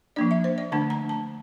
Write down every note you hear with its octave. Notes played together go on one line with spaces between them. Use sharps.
F3 A#3 D4 D5
E5
C5
D5
D3 A3 D4 A5
A#5
A5